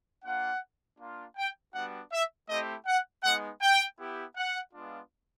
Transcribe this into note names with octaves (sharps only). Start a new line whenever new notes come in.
A#3 D4 F4 F#5
A#3 D4 F4
G5
G3 B3 D4 F#4 F#5
E5
A3 C4 E4 G4 D#5
F#5
G#3 B3 D#4 F#5
G5
B3 E4 G4
F#5
G#3 B3 D4 F4